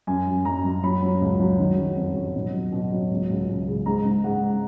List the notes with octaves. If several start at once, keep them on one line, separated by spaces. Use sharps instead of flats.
F#2 G#5
F#2
F#2 A#5
F#2
F#3 B5
F#3
C#2
F#3
D#3
F#3
F2
F#3
B2
F#3
B2
F#3
C#2
C#2
C#2
C#3
G#2 A#5
G#2
G#2 F#5